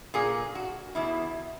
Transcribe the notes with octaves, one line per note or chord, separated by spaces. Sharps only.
A#2 G#4
F#4
E2 B2 E4